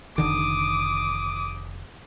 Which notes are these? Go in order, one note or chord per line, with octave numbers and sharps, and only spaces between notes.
F1 D3 D#3 D6 D#6